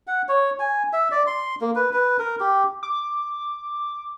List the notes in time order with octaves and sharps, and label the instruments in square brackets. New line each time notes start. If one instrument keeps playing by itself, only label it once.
[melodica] F#5
C#5
G#5
E5
D5
C6
A#3
B4
B4
A#4
G4
[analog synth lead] D6